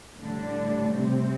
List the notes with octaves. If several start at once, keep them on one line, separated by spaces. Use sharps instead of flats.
A2 D3 G3 D4
C3 C4